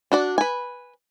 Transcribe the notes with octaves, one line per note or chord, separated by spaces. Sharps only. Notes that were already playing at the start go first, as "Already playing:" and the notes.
D4 F#4 D5
B4 G#5